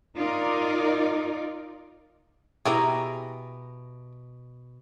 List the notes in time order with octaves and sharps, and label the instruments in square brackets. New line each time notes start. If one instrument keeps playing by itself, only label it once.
[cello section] D#4 F4 A#4 D5
[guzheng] B2 A#5 [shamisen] E4 G4 G#4